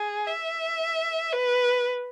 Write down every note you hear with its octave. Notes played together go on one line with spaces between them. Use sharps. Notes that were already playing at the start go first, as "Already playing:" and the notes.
Already playing: G#4
E5
B4